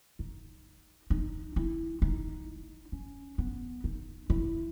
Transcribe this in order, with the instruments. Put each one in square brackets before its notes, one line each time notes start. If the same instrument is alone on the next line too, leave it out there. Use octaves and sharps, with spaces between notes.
[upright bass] D#4
D#4
E4
D#4
C#4
B3
D#4
E4